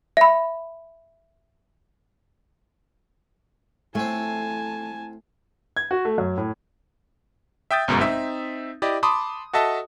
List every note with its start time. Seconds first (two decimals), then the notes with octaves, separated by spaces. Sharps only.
0.17 E5 B5
3.95 A2 A3 C4 G#5 A5
5.77 G#6
5.91 F#4
6.05 A3
6.18 F#2
6.37 A2
7.71 E5 G5 D#6 G6 A6
7.88 G1 F#2 B2 G#3 A#5
8.00 C4 D#4 E5
8.82 E4 G4 D5 D#5
9.03 A5 B5 C6 D6 D#6
9.53 F#4 A4 D#5 E5 A5